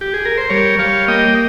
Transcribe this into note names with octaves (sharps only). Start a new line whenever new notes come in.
G4
G#4
A#4
C5
G3 A#4 C#5
G3 C#5 F5
A#3 D#5 G5